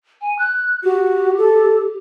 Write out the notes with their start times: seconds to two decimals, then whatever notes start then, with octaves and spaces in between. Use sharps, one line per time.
0.21 G#5
0.39 F#6
0.84 F#4 G4
1.38 A4